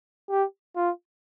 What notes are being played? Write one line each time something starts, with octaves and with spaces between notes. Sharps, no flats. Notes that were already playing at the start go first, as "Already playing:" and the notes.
G4
F4